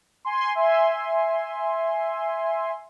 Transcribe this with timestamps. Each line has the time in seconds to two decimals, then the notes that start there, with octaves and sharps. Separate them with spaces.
0.25 G#5 C6
0.55 E5 G#5 C6